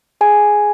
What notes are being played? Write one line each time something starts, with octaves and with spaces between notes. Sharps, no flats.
G#4 G#5